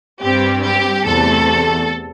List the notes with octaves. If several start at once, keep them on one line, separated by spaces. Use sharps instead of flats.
G2 G3 C4 G4
G4
E2 C3 A3 A4